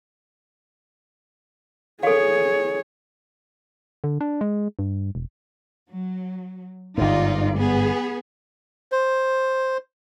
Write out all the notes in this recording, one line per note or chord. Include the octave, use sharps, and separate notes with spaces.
G#4 A4 C#5 F5
D3
D4
G#3
G2
E1
F#3
G1 G#2 D#4 F4 D5
B3 G#4
C5